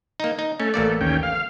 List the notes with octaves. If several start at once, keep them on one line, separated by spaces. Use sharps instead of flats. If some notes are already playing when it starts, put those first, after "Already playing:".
A#3 D#4
D#4
A3 C#4
A1 A#3 D5
D#2 C#4 G5
F5